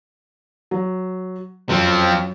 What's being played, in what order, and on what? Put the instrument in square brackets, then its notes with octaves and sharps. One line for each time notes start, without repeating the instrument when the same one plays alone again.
[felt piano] F#3
[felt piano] F#2 [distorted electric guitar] F3 C4